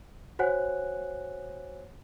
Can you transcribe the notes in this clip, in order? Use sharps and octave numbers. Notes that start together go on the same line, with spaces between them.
F#4 C5 C#5 F#5 G#5 F#6